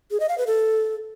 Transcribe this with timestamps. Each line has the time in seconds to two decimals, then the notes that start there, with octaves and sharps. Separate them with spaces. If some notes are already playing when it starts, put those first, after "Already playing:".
0.11 G#4
0.20 D#5
0.29 F5
0.38 B4
0.47 A4